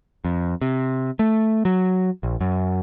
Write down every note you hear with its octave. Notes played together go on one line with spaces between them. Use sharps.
F2
C3
A3
F#3
A#1
F#2